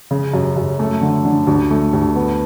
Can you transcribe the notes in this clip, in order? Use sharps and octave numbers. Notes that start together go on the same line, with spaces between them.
C#3
F#2
F#2
A3
D3
D3
D2
A3
D2
B3